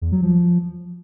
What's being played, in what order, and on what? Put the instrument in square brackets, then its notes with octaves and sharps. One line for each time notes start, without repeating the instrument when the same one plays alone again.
[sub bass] E2
F#3
F3